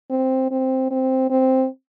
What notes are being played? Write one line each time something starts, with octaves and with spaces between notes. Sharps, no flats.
C4
C4
C4
C4